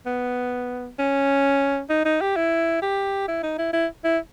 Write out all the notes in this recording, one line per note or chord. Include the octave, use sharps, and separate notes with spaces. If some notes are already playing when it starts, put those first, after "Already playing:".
B3
C#4
D#4
D#4
G4
E4
G4
E4
D#4
E4
E4
E4